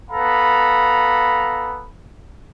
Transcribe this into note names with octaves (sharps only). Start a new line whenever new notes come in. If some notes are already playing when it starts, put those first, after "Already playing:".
B3 A4 F5 A#5 B5